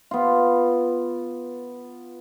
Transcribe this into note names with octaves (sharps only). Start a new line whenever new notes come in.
B3 F4